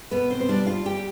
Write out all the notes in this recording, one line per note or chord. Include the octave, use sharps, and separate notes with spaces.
B2 B3 B4
C4 C5
C5
G3 D4 D5
F4 F5
G3 G4 G5